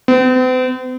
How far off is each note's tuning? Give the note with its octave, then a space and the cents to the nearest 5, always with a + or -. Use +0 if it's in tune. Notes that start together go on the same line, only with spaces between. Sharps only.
C4 -45